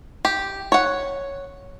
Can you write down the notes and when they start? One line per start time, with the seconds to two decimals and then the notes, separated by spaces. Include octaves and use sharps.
0.25 G4
0.72 C#5 F#5